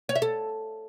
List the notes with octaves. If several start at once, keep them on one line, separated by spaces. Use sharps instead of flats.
C#5
E5
A4